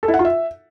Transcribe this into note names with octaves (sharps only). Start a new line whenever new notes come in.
A4
E4
F#5
F4
E5